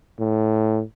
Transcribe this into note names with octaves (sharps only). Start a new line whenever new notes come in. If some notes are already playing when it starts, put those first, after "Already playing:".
A2